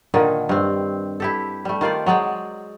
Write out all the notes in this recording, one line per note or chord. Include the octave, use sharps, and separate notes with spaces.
A#2 D3 D#3
G2 C4
E4 G4 A4
G3 A3
D#3 F4 C5 D5
F#3 G#3 D5 G5